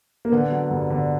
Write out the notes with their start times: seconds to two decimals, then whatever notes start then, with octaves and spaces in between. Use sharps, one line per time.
0.25 A#3
0.32 D3 B3
0.52 F#3
0.70 G1
0.90 D3